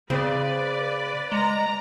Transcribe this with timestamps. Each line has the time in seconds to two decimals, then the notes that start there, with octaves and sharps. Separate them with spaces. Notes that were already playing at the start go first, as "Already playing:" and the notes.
0.10 C#3 C4 B4 D5
1.32 G#3 A#5